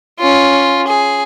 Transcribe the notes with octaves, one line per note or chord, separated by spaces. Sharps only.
C#4 F4
G#4